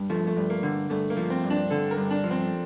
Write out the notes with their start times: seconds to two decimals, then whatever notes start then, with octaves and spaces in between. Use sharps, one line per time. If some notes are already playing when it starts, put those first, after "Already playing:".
Already playing: G2
0.10 F3 A3
0.27 A3
0.37 G2
0.50 A#3
0.63 D3
0.90 G2 A3
1.10 A#3
1.17 F3
1.30 C4
1.44 G2
1.50 D4
1.70 D3 A4
1.91 A#4
1.97 G2
2.11 D4
2.24 F3
2.31 C4